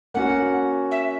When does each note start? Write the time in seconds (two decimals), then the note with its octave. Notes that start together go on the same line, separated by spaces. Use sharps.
0.14 A#3 C#4 F#4 F#5
0.91 E5